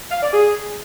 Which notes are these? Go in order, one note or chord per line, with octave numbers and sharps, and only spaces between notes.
F5
D5
G#4